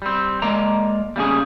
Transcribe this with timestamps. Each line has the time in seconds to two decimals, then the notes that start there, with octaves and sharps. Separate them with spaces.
0.02 G3 C4
0.42 G#3 A#3 D5 A#5
1.16 G3 A#3 C#4 G#4